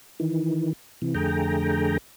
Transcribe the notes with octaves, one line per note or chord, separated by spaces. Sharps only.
D#3 E3
C3 E3
F2 D3 A3 G#4 G5 A#5